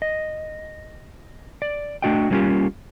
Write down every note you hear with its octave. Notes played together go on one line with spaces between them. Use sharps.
D#5
D5
A3 D4 F#4 D#5 G5
F#3 G3 A#3 C#4 F4 G4